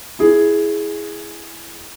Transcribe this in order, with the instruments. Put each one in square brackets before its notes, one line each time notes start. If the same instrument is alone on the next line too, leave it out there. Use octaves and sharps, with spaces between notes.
[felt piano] E4 G#4